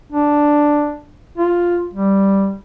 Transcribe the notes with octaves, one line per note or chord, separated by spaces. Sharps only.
D4
F4
G3